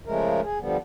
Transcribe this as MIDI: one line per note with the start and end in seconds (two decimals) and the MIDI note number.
0.06 0.41 49
0.06 0.41 53
0.06 0.41 56
0.06 0.41 57
0.06 0.41 70
0.43 0.58 68
0.60 0.77 50
0.60 0.77 53
0.60 0.77 55
0.60 0.77 59